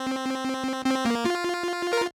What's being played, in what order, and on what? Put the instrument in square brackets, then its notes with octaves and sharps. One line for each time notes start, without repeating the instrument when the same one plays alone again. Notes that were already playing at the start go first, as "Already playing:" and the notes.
Already playing: [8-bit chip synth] C4
C4
A#3
F4
A#4